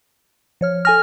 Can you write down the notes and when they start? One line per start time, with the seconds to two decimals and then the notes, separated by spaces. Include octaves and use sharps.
0.61 F3 C#5 F6
0.85 A4 G#5 F6 A#6